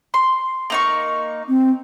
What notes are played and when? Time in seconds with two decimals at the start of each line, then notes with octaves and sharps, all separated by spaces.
0.14 C6
0.70 A#3 D#4 C#6
1.48 C4